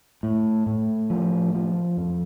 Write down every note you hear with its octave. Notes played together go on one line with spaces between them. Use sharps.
A2
A2
F3
F3
F2